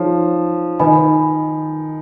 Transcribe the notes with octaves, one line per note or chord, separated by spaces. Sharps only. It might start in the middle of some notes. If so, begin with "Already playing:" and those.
Already playing: F3 D#4 G#4 C#5
D#3 B4 D#5 G#5 B5